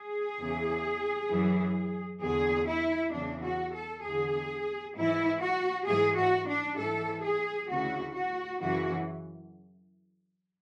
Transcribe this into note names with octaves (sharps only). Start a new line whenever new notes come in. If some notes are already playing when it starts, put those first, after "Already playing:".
Already playing: G#4
E2 C#3 E3
F#2 E3
E2 D3 G#4
E4
E2 C#3 E3 D4
F#4
A4
E2 D3 G#4
G#2 E3 E4
F#4
G#2 E3 G#4
F#4
D4
G#2 E3 A4
G#4
D2 C#3 E3 F#4
F#4
F#2 C#3 E3 F#4